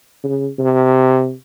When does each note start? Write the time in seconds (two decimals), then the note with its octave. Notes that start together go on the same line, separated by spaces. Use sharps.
0.24 C#3
0.59 C3